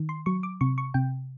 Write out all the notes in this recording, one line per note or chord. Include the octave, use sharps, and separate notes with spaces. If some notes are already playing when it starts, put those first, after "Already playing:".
Already playing: D#3
C6
F#3 C#6
D6
C3 C#6
C#6
C3 G5